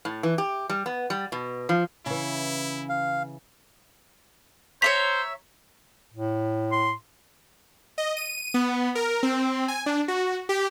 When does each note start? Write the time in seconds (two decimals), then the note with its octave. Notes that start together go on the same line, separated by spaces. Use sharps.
0.05 A2
0.23 E3
0.38 G4
0.70 G3
0.86 B3
1.10 G3
1.32 B2
1.69 F3
2.06 C#3 E3 E4
2.89 F5
4.82 C5 C#5 E5 A#5 B6
6.14 A2
6.72 C6
7.98 D#5
8.17 D#7
8.54 B3
8.95 A#4
9.23 C4
9.68 G#5
9.86 D4
10.08 F#4
10.49 G4